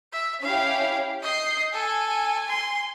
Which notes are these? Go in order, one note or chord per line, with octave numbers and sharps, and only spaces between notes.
E5
C#4 E4 G4 F5
D#5 G6 C7
A4 G#5
C6